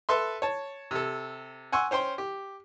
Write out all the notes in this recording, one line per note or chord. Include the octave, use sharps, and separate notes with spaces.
A4 B4 E5 C6
C#5 A5
C3 A4
F#5 G#5 C6 C#6 E6
C#4 C5 G5 C6
G4